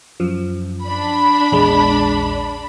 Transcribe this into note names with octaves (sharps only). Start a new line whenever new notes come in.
F#2 F3
D4 B5
A#1 E2 G#3